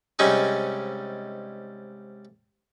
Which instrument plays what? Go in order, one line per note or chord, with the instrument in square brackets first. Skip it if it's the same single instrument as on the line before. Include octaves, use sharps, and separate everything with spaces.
[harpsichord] G#2 C3 G3 G#3 C#4 D#4